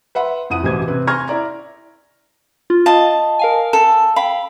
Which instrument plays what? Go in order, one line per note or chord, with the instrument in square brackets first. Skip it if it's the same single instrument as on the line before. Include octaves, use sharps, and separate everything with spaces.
[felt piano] B4 E5 F#5 B5 C6
F2 E4 F#5 D#6 D#7
A1 B2 E3 G4 C5 G#6
C3 C4 B4
G#5 C6 C#6 F6 G#6 A#6
E4 D5 A#5
[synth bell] F4
[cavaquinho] D#5 A5 [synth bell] F5
[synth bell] A#4 F5 G#5
[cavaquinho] A4
[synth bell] F5 G5 [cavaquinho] B5